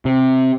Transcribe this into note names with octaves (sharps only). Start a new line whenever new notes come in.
C3